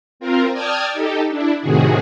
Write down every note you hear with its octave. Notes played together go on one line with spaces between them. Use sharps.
C4 F4 A#4
D5 G5 A5 D#6 F6 G#6
D#4 G4 A4
D4 E4
A2 C3 D#3 F#4 G#4